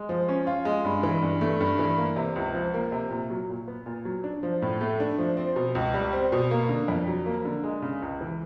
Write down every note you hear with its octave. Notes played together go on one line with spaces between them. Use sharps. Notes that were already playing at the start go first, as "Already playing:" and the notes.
Already playing: G#3
F3
C#4
F4
G#3
G2
E3
G2
A3
G2
E3
A#3
C3
C#2
F3
A#3
C3
A#2
F#3
A#2
B3
A#2
F#3
D4
F3
A2
A3
D4
F3
C4
B2
C#2
G3
C4
B2
A#3
D3
F2
F#3
A#3
D3
G#3
C#3
C#2
E3